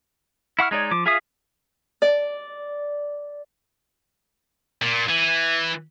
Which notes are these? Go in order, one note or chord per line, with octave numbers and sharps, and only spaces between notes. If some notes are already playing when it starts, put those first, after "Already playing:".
E4 F#5 C#6 F6
G#3 D#4 C#5 D5
F3 D6
F4 G#4 E5 F5 D#6
D5
A#2
E3